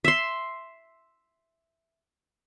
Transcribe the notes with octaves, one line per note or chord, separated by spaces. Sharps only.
E5 C6